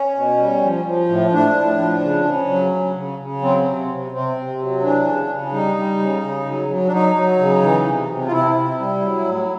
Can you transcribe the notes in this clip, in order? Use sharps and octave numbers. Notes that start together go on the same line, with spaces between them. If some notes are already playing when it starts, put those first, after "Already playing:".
Already playing: C#4
B2
G3
F3
F3
A2
A2 D4
A2
F3
C#3
C#3
F#3
C#3
C#3
C#3
F#3 C4
C3
C3
C3 C4
C3
F#3
E3 D4
C#3
C#3
G3 D#4
G3
C#3
C#3
F#3
F#3
D4
F#3 D#4
F#3
C#3
E3
C3
C3
F4
C3 E4
C3
G3
F#3
A2